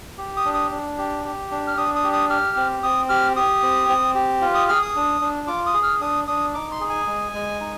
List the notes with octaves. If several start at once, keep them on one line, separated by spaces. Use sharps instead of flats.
G4
D#6
D4
D#6
D4
G4
G4
D4
F6
D4 D#6
D#6
G4
D#6
G4 F6
C4
C4 D#6
G4 F6
G4 D#6
C4
C4
G4
F4
D#6
G#4 F6
D#6
D4
D4
F4 D6
D#6
G#4
F6
D4 D#6
D4 D#6
D#4 D6
C6
G#4
G#5
G#3
G#3
D#4